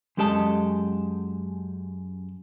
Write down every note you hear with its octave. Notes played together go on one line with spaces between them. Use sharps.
F#2 G#3 G4 A4 D#5 A5